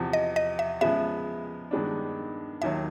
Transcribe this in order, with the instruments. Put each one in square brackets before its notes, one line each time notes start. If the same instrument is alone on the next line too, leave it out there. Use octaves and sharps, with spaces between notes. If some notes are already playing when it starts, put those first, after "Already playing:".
Already playing: [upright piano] E2 C3 F3
[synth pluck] D#5
D#5
E5
[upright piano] C#3 F3 G#3 B3 [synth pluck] E5
[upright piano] G2 D#3 G#3 B3 D4
[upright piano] D#2 D#3 F#3 [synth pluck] E5